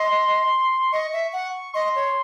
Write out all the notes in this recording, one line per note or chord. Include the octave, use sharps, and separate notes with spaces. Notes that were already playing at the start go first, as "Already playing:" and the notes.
Already playing: D#5 C6
D#5 C#6
E5
F#5
D#5 C6
C#5